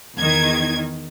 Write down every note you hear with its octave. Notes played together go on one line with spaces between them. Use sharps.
E2 D#3 G#6